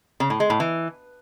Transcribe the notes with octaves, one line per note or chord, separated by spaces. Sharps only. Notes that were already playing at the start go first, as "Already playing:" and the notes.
C#3
A2
G#3
A2
E3